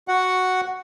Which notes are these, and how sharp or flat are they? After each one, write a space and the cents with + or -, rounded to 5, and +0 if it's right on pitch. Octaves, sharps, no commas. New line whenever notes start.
F#4 +0 F#5 +0